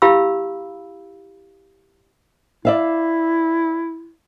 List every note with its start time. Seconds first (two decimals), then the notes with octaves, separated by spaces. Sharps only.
0.02 E4 G4 F5 B5 E6
2.65 E4 D5 E5 F5